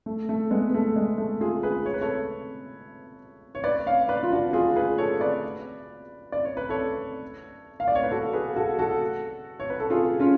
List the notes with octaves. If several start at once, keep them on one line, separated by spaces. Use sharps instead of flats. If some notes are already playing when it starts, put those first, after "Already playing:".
A3
A3
G#3 B3
B3
A3
G#3
A3
F4 G#4
G#4 B4
C#5
B4
A4 C#5
C#5
B4 D5
C#5 F5
B4 D5
F4
D4 F#4
F4 G#4
G#4 B4
A4 C#5
B4 D5
D5
C#5
B4
A4 C#5
F5
D5
C#5
B4
F#4 A4
G#4 B4
F#4 A4
F#4 A4
C#5
B4
A4
F4 G#4
C#4 F4